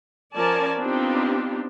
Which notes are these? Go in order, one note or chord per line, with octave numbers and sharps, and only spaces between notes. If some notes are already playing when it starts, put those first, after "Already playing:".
F3 C#4 A#4 D5 G#5 A5
B3 C4 D4 D#4 F4 G4